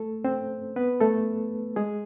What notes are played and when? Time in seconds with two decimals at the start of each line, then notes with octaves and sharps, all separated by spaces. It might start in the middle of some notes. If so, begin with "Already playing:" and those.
Already playing: A3 A4
0.24 C4 C5
0.76 B3 B4
1.01 A3 A4
1.76 G#3 G#4